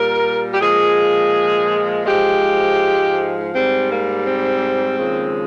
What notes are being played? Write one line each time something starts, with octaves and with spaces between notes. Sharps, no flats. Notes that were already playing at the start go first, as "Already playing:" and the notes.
Already playing: A#2 G3 A#4
G4
A#2 F3 G#3 G#4
G#2 F3 G#3 G4
G#2 G3 C4
A#3
C4
D#2 C#3 F3 G#3